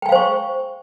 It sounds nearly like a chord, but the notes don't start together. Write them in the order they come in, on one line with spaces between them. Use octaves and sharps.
G5 G#5 F5 C5 C#6